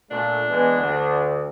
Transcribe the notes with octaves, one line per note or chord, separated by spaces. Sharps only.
A#2 A3 D4
E3 G#3 B3
D2